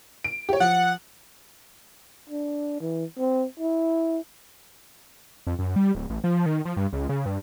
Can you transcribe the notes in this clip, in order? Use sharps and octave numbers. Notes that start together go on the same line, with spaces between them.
D7
G4 C#5
F3 F#5
D4
E3
C4
E4
F2
F#2
G3
D1
A1
F3
D#3
F3
G2
C#2
C#3
G2